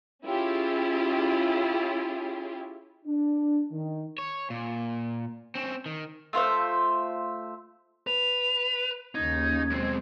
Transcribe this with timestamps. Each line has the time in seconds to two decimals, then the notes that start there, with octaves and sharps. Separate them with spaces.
0.25 C#4 E4 F4 G4 G#4
3.06 D4
3.71 D#3
4.18 C#5
4.50 A#2
5.55 C4 C#4
5.86 D#3
6.33 A3 F4 C5 E5
8.07 B4 F7
9.15 D#2 C#3 C#4 D#4 G#6
9.70 F#2 B2 G#3 C4